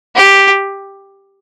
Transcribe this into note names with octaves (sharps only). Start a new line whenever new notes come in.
G4